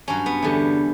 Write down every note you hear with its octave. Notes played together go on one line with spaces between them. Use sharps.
G2 F#3 C#4
B3
E2 D3 G3